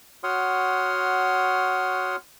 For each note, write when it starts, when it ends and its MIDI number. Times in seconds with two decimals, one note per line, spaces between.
0.23 2.16 66
0.23 2.16 73
0.23 2.16 78
0.23 2.16 84
0.23 2.16 87
0.23 2.16 89